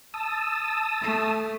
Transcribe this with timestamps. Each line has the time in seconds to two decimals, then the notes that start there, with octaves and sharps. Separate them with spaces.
0.14 A5 D#6 E6
1.02 A3